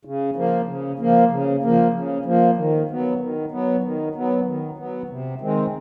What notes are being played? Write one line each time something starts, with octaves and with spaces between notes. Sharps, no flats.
C#3
F3 A#3
C#3
F3 A#3
C#3
F3 A#3
C#3
F3 A#3
D#3
F#3 B3
D#3
F#3 B3
D#3
F#3 B3
D#3
F#3 B3
C3
D#3 G#3 C4